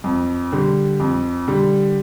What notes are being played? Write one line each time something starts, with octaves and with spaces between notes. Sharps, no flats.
F2
D3 G3
F2
D3 G3